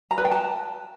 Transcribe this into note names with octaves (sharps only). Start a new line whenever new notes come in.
A#5
B4
G5
A5